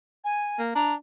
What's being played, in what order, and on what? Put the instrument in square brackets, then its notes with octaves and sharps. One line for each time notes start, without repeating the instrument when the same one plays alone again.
[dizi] G#5
[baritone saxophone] A#3
[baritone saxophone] D4 [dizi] A#5